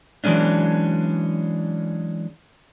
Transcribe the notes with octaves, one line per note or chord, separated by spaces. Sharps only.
E3 F#3 G#3 C#4 D4